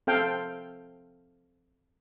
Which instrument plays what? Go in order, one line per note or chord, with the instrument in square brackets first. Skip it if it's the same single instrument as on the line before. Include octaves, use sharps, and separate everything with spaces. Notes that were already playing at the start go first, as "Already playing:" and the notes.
[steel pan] C4 A4 F5 G5